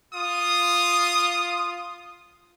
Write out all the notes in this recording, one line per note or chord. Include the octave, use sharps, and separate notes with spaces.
F4 D#6